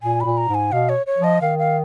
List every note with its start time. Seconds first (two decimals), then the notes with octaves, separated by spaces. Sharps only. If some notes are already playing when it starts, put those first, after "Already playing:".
0.03 A#2 G#5
0.21 A#2 B5
0.37 A#5
0.49 G#2
0.55 G#5
0.72 B2 F5
0.89 C#5
1.07 C#5
1.18 F3
1.24 D#5
1.41 D#3 F5
1.59 F5